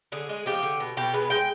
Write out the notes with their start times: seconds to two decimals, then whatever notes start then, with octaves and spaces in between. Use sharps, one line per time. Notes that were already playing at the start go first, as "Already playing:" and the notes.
0.12 D3 G#4
0.29 G#3
0.46 F3 G4
0.63 D3
0.80 B2
0.97 B2 G4
1.13 G#3 B4
1.30 G#3 G5